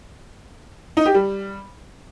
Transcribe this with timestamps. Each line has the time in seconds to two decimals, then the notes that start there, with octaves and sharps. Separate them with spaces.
0.97 D#4
1.06 G4
1.14 G3